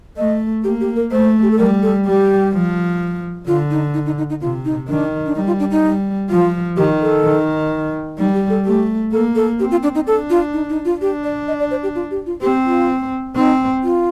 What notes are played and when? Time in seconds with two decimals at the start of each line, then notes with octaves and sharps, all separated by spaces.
0.17 A3 D#5
0.64 A#3 G4
0.80 G4
0.96 A#4
1.12 A3 C5
1.42 G4
1.51 A4
1.58 G3 A#4
1.82 A4
2.06 G3 G4
2.53 F3
3.47 D3 F4
3.71 D#4
3.94 D#4
4.06 D#4
4.18 D#4
4.30 D#4
4.41 C3 F4
4.65 D#4
4.88 D#3 D4
5.26 D4
5.35 G3 D#4
5.47 F4
5.59 D4
5.71 D#4
5.83 G3
6.30 F3 F4
6.76 D#3 G4
7.01 A4
7.24 D#3
8.18 G3 D#4
8.34 G4
8.50 A4
8.65 A3 G4
9.12 A#3 A4
9.35 A4
9.60 C4 G4
9.71 F4
9.83 D4
9.95 D#4
10.07 D4 A4
10.30 F4
10.53 D#4
10.70 D#4
10.85 F4
11.01 D4 G4
11.24 D5
11.48 D#5
11.60 D5
11.71 C5
11.83 G4
11.95 F4
12.11 G4
12.26 F4
12.42 C4 G4
12.65 F4
13.36 C4 D#4
13.83 F4